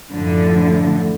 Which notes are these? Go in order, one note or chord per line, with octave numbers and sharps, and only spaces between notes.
F#2 A2 D3 F3